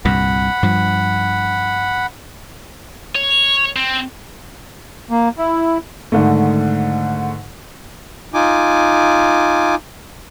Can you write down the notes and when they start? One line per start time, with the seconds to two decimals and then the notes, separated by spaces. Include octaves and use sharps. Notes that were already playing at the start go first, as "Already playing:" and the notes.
0.05 C2 G2 A#2 F#5 B5
0.63 G2 F3
3.15 C#5
3.76 C4
5.11 A#3
5.38 E4
6.12 G#2 D3 D#3 A3
8.34 D#4 F4 G#5 D6